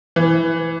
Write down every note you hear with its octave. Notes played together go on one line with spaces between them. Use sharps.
E3